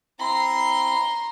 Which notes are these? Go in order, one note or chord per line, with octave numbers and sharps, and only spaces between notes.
C4 E4 A#5 C6